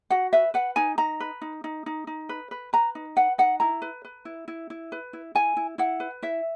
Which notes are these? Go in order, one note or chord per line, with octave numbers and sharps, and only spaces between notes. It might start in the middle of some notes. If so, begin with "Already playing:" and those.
F#4 F#5
B4 E5
B4 F#5
D#4 G#5
D#4 A#5
B4
D#4
D#4
D#4
D#4
B4
B4
B4 A#5
D#4
B4 F#5
D#4 F#5
E4 A#5
B4
B4
E4
E4
E4
B4
E4
E4 G#5
E4
E4 F#5
B4
E4 E5